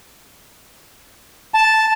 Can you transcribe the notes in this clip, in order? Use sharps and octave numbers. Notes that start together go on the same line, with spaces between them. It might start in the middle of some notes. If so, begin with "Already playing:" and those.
A5